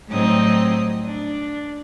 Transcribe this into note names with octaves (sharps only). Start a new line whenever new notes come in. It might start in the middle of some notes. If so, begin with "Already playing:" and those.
A2 F#3 G3 C4 D#4 D#6
D4